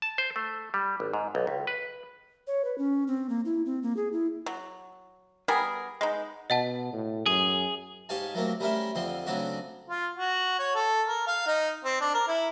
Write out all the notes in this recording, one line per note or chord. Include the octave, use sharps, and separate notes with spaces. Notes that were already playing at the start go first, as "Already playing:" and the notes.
A5
C5
A3
G3
G#1
G#2
B1
C#2
B4
C#5
B4
C#4
C4
A#3
E4
C4
A#3
G#4
E4
F#3
G3 B3 G#4 A#4
G#3 B3 D#4
B2 D#5 F#5 A5
A2
F#2 G#4
G#2 G4 C#5 F5 G#5 A5
F#3 A3 A#3 C4
G3 A3 C#4 A#4 C5 E5
F2 D3 F3 C4 C6
C#3 F#3 A3 C4 D4 F#4
F4
F#4
C#5
A4
A#4
F5
D#4
C4
D4
A#4
E4